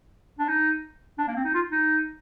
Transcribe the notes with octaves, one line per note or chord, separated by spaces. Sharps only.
D4
D#4
D4
A#3
C4
D#4
F4
D#4